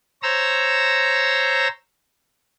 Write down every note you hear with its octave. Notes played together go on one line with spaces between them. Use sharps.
C5 C#5 A#5 E6